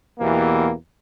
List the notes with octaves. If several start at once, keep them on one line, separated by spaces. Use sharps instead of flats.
E2 B2 E3 A#3 G4